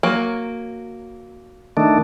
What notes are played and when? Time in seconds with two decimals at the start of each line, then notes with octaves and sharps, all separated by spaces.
0.03 F#3 A#3
1.77 D#3 A3 D4